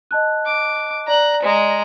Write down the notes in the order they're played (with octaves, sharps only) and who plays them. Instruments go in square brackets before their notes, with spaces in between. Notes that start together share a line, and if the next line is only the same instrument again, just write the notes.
[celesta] D#5 A5 F#6
[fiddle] D6
[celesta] D5 [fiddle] A#5 F#6
[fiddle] G#3 A#5